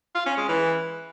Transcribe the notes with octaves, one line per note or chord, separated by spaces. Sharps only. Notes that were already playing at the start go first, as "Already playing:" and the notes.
F4
C#4
G#3
E3